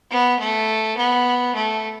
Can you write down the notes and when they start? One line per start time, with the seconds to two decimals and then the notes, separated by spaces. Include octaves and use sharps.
0.10 B3
0.39 A3
0.97 B3
1.55 A3